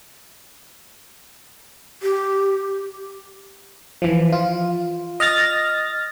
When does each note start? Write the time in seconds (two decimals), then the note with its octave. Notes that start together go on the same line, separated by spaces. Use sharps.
2.03 G4
4.02 E3 F3
4.32 F4
5.20 D#5 F6 A6 A#6